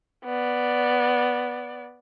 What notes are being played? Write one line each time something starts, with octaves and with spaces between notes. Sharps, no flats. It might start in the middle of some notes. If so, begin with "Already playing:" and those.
B3 D5